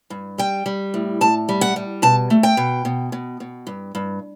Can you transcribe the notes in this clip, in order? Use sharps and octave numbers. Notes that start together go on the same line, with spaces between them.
G2
G3 G5
G3
A2
A2 A5
G3
F#5
G3
B2 A5
A3
G5
B2
B2
B2
B2
G2
G2